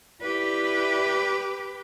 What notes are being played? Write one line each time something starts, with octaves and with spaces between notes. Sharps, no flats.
E4 G4 B4 D5